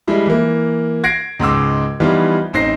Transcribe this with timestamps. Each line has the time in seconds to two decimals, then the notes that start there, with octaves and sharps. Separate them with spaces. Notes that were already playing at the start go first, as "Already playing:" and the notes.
0.07 F3 G3 G#3 E4
0.26 E3 A#3
1.04 G#6 A#6 C7 D7
1.40 C#2 G#2 G#3 D6 E6
2.00 E3 F3 G3 B3 D#4 F4
2.53 A1 C4 D#4 A#6 C7